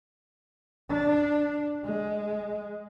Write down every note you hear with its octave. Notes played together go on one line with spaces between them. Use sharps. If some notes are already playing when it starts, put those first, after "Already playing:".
D4
G#3